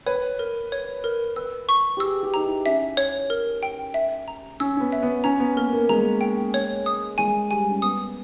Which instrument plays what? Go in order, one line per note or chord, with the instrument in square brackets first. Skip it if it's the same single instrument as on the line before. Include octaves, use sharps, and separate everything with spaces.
[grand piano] B4 [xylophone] C#5
[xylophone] A#4
C#5
A#4
[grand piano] B4 [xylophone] E6
[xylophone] C#6
[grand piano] G4
[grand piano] G#4 [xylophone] E6
[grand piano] G4
[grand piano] D#4 [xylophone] A#5
[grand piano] E4
[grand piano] C#4 [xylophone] E5
[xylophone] C#5
A#4
G5
E5
A#5
[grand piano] C#4 [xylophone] E6
[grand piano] C#4
B3
[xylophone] E5
[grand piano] B3
[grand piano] C#4 [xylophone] A#5
[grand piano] B3
[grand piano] A#3 [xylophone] A#4
[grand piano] A#3
[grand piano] G#3 [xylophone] A#5
[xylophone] G5
C#5
D#6
[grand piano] G#3 [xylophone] G#5
[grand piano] G3 [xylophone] G#5
[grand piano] C#4
[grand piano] B3 [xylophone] D#6